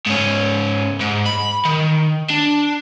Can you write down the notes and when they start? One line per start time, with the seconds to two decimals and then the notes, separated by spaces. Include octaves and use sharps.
0.07 G#2 C#4
1.01 G#2
1.26 B5
1.65 D#3
2.30 D4